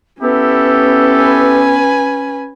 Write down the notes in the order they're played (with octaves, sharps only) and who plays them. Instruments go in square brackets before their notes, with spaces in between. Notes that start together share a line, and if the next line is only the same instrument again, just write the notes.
[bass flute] B3 [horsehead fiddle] C#4 [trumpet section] E4 G4 A4
[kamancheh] B4 G#5